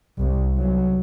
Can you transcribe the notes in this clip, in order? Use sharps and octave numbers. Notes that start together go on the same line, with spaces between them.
C2
F#3